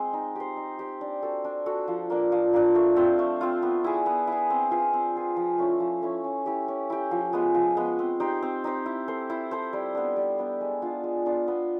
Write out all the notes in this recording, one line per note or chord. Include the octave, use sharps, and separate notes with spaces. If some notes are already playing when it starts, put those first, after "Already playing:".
Already playing: G#3 C4
D#4
G4 C5
D#4
G4 C5
D4
F#4 A4
D4
F#4 A4
F3
A#3 D4
F3
A#3 D4
A3
C4 F4
A3
C4 F4
B3
E4 G#4
B3
E4 G#4
C4
F4 G#4 B4
C4
F4 G#4 B4
F3
A3 C#4 E4
F3
A3 C#4 E4
C#4
E4 G4
C#4
E4 G4
F3
G#3 B3
F3
G#3 B3
C4
D#4 G4 C5
C4
D#4 G4 C5
E4
A4 C5
E4
A4 C5
G3
B3 D4
G3
B3 D4
G#3
B3 D4 F4
G#3
B3 D4 F4
B3